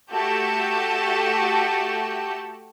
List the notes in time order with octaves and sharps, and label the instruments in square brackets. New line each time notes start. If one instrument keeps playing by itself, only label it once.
[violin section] A3 F#4 G4 A4 A5 G6